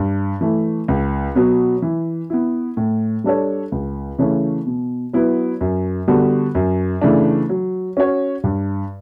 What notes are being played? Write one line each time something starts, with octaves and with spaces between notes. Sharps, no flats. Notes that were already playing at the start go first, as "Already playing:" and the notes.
Already playing: G2
E3 A3
C#2
B2 F#3 B3
E3
B3 E4
A2
G3 D4 A4 C#5
C#2
C#3 E3 A3 C#4
B2
F#3 B3 E4 B4
F#2
D3 G3 B3 F#4
F#2
C#3 E3 A3 D4
F#3
C#4 F#4 C#5
G2